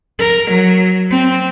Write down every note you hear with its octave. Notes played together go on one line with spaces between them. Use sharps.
A#4
F#3
C4